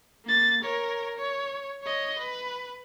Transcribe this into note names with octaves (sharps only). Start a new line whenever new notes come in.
A#3 A6
A#4 C#5
C#5
C#5 D#5
B4